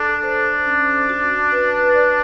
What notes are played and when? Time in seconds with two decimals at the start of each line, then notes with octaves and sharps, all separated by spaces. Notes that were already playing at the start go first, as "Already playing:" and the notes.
Already playing: D4 A4
0.23 C5
0.66 C#4
1.09 F#4
1.52 B4
1.94 D5